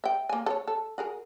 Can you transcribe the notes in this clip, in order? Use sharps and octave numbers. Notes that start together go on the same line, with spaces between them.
E5 G5
A#3 G#5
A4 C#5
A4
F#4 G#4 A#4